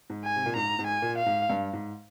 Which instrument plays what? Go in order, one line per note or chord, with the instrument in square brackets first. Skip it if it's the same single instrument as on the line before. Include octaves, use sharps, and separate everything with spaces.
[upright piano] G#2
[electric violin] G#5
[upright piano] C3
A#2
[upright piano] G#2 [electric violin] A#5
[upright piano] G#2
[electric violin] G#5
[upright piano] A#2
[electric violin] F5
[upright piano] G#2
G2
G#2